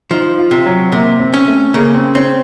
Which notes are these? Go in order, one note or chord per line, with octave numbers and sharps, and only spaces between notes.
F3 D#4
F4
C3
F#3
C3 A#3
C4
C#4
A3
C#3 A#3
C4
C4 C#4